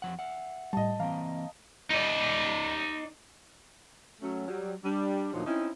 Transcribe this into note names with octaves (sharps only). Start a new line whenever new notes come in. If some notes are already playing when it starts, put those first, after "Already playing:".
F2 F3 F#5
E5 F#5
A2 G3 D#5 A5
E3 A#3 C4 F5 A#5
D#4 D5
F#3 A3 C#4
F#3 G3
G3 D4
D2 A#2 F3 F#3 D4 D#4
C4 C#4 D#4 E4